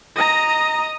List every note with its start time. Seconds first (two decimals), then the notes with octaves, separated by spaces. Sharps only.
0.16 D#5 A#5